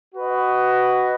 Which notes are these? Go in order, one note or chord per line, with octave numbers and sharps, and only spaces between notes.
F#4 B4 D#5